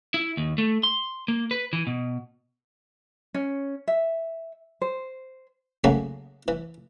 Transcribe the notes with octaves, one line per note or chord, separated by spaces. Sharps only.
E4
D#2
A3
C6
A#3
B4
E3
B2
C#4
E5
C5
C#3 F#3 A3 A#3 F#4 G#4
E3